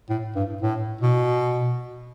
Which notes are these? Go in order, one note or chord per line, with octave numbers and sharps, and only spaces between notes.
A2
G2
A2
B2